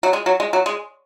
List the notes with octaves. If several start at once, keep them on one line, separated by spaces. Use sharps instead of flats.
F#3
G#3
F#3
G#3
F#3
G#3